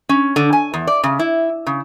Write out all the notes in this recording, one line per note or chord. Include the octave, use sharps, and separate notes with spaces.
C#4
D3
G#5
E2
D5
C#3
E4
C#3